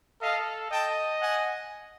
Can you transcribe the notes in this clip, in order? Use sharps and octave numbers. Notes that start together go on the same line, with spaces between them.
A4 D#5 F5
D#5 G5 A5
F#5 G#5